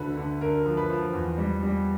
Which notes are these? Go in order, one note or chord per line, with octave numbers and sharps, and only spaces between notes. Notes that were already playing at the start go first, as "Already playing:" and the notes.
Already playing: D2 D3 B4
D3
D3 A#4
F3
B4
F3
E2
G3
G3